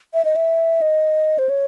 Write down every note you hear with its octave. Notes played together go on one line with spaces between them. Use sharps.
E5
D#5
E5
D#5
C5
C#5